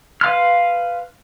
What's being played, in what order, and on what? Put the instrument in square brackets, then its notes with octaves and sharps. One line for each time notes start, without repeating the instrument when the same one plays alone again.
[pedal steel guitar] B4 F5 C6 F6